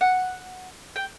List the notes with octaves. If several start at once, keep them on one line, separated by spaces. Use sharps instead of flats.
F#5
G5